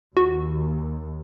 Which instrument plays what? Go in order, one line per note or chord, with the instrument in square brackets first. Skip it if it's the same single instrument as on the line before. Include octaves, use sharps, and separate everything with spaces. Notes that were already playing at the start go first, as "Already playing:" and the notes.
[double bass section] D#2 [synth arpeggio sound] F#4